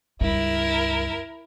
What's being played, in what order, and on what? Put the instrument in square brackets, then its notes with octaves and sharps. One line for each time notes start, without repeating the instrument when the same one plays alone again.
[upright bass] C#2 G2 [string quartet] E4 A#4